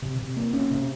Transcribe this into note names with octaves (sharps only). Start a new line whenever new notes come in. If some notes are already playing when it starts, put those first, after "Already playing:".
C3
C3
A#3
C#4
C3